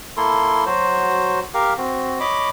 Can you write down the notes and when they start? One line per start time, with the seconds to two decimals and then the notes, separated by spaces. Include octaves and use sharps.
0.17 A#3 E4 A4 C6
0.66 F#3 F#4 C5
1.54 G4 A#4 F5
1.78 C4 F#4
2.20 C#5 D#5 B5 D6